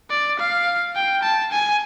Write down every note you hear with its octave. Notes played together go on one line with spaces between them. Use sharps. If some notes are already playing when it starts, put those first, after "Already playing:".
D5
F5
G5
A5
G#5